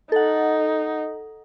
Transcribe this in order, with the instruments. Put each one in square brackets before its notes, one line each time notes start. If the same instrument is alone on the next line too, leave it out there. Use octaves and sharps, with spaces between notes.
[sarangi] D#4 [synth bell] A4 F#5